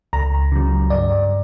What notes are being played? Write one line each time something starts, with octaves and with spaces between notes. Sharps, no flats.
C#2 A#5
C#3 F#3
G2 D5